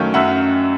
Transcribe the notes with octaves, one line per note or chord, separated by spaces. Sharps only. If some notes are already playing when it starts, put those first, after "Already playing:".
Already playing: F#2 D#3 F#3 A3 C#4 F5 G5
F#2 E5 F#5